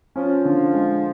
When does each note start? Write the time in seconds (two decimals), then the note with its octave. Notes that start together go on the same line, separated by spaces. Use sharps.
0.16 F3 C#4
0.45 D3
0.74 G#3